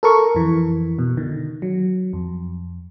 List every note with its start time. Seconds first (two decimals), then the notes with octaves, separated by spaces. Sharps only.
0.03 A4 A#4 C#6
0.35 F2 E3
0.99 B2
1.17 D3 D#3
1.62 F#3
2.13 F2